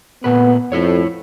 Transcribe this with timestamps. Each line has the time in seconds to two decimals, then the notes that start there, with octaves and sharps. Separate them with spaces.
0.24 A#2 A3 B3 B4
0.72 F2 E4 A4 C#5